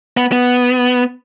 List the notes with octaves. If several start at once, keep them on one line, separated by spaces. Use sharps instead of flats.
B3
B3